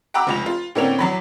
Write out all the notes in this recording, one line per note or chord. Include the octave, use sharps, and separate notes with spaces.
F#5 G5 A#5 B5 D6 E6
F1 C#2 F7
F4
A2 D3 A#3 C4 C#4 F7
E2 F#3 B5